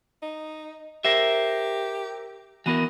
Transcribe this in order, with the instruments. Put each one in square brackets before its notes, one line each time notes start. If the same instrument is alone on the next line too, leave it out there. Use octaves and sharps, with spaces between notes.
[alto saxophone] D#4
[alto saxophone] G4 [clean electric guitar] A#4 C5 E5
[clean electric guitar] E3 B3 A#4 [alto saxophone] F#4